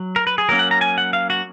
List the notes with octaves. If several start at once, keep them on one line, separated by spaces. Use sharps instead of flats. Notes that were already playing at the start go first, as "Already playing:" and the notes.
Already playing: F#3
A#4
B4
G#4
F#3 A#3 C#4 A#4
F#5
A#5
G#5
F#5
F5
F#4